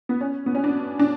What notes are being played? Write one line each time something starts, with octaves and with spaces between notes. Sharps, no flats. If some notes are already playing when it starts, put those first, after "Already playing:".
B3
C#4
B3
C#4
D4
D4